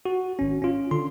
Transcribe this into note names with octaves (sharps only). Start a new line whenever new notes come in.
F#4
G#1 C#4
C#4 F4
D3 C6